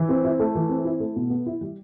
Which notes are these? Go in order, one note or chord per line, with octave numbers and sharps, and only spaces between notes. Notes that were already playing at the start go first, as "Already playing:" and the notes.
Already playing: E3
C4
E4
A3
E3
C4
E4
A3
B2
B3
E4
G3